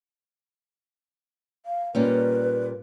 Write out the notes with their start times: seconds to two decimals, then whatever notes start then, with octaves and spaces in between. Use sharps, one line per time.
1.66 F5
1.95 A#2 G3 C#4 B4